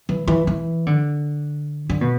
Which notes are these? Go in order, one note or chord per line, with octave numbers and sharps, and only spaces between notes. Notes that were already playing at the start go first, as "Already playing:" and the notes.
E3
E3
E3
D3
D3
B2